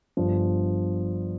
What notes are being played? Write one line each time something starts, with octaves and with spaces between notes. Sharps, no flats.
G1 G2 F3